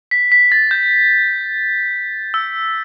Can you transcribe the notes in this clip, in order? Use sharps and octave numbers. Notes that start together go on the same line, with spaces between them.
B6
B6
A6
G6
E6